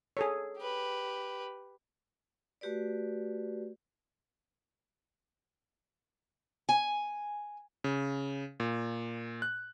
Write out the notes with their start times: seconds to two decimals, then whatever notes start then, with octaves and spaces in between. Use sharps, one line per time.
0.17 G#4 A4 C#5
0.58 G4 B4
2.61 A3 F#4 G4 B4 D5
6.69 G#5
7.84 C#3
8.60 A#2
9.42 F#6